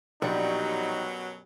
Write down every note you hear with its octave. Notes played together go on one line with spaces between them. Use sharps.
A#1 F#2 B2 F#3 G3 D#4